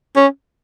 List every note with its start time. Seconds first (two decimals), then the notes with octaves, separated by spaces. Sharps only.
0.16 C#4